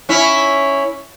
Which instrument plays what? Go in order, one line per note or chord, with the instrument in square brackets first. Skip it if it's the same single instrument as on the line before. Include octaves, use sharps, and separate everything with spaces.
[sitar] C#4 E4